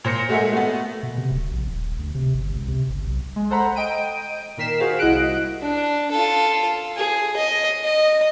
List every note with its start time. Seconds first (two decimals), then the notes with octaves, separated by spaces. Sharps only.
0.04 A#2 C5 A#6 C#7
0.29 G#3 A3 F#4 G#4 A#4 E5
0.53 A3 B3
1.03 B2
1.18 C3
1.31 D1
1.51 A#1
1.68 D#1
1.99 D2
2.15 C3
2.34 G1
2.55 C#2
2.68 C3
2.89 G1
3.06 B1
3.36 G#3
3.50 A4 C5 F#5 A#5 B5
3.76 D#5 G5 D7 D#7
4.57 A#2 D#3 A#4 B6 C7 E7
4.80 F4 F#4 G#4 C5 F5
4.99 C2 E4 D#5 F#5 F#6 D7
5.61 D4
6.11 F4 A4
6.96 G#4
7.36 D#5
7.84 D#5